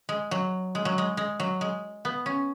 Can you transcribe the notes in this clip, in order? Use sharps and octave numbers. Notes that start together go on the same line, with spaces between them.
G#3
F#3
G#3
F#3
G#3
G#3
F#3
G#3
B3
C#4